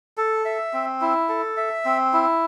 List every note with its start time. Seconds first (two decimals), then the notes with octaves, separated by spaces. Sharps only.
0.17 A4
0.45 E5
0.73 C4
1.01 E4
1.29 A4
1.57 E5
1.85 C4
2.13 E4